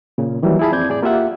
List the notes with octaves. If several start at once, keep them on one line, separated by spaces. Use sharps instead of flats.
A#2 C#3
D#3 E3 F#3 G3 A#3
E4 F4 G#4 A5 B5
F2 C4 D5 D6 G6 G#6
A2 G#4 D5
A#3 F4 G4 E5 F#5